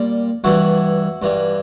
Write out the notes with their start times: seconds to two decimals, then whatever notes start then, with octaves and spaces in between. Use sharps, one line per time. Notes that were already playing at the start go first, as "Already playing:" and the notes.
Already playing: A#2 G3
0.44 G2 E3 G3 E4 F#4
1.22 G2 E3 G3